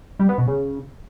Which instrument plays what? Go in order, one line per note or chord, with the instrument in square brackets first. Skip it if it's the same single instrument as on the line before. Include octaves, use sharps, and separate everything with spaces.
[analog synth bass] G3
B3
B2
C#3